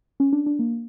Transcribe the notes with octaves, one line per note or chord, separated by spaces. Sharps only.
C#4
D4
D4
A#3